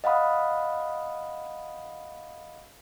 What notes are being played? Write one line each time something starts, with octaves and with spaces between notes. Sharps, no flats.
D#5 F5 F#5 B5 D#6